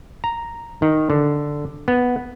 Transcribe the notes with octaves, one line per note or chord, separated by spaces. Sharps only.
A#5
D#3
D3
B3